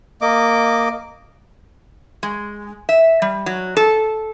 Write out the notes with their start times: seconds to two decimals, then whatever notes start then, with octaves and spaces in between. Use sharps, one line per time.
0.21 A#3 D#5 D6
2.23 G#3
2.89 E5
3.22 G3
3.46 F#3
3.77 A4